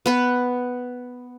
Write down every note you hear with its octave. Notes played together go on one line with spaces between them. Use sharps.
B3 B4 F#5